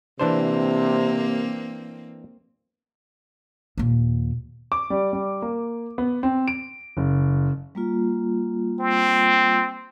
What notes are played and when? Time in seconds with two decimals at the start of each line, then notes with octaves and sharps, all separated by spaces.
0.20 C3 E3 A#3 C4 D4 C5
3.78 D#2 A#2
4.72 D6
4.90 G3
5.13 G3
5.42 A#3
5.98 B3
6.23 C4
6.48 D7
6.97 F#1
7.75 G3 A#3 F4
8.80 C4